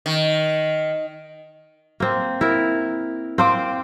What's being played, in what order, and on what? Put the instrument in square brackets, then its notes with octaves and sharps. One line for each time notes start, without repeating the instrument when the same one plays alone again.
[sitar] D#3
[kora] A#3 C4
E4 A#4
[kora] C4 C5 G5 [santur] F5 C6 D6